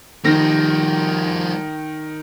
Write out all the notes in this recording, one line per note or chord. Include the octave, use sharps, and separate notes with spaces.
D#3 F3 G3 A#6